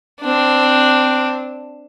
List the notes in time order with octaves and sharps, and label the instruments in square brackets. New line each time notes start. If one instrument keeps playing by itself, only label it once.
[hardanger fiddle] C4 D4